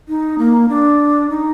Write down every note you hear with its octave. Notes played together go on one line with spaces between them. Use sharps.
D#4
A#3
D4
D#4